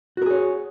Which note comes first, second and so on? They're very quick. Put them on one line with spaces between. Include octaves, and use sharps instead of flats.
F#4 A#4 G#4 C#5